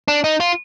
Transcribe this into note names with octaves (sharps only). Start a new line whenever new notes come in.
D4
D#4
F4